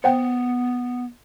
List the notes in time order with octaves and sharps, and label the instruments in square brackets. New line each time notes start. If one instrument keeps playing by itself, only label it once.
[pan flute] B3 [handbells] C5 F#5 G5